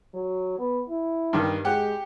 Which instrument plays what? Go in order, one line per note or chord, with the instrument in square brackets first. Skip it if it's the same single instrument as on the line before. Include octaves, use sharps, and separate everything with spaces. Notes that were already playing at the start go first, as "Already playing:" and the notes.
[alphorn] F#3
B3
E4
[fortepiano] G2 D#3
[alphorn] G#3 [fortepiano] G4 F#5